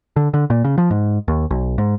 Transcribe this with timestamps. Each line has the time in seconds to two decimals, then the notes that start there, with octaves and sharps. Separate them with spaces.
0.16 D3
0.34 D3
0.50 A#2
0.64 C#3
0.78 F3
0.91 G#2
1.28 D#2
1.50 B1
1.78 G#2